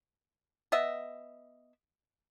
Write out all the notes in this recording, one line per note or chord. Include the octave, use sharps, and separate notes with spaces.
B3 D#5 E5